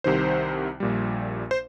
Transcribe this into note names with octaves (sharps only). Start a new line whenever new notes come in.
C2 C3 D#3 C5
A#1 A#2 G3
C5